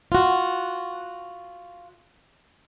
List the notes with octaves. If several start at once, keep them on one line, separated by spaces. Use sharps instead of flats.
F4 F#4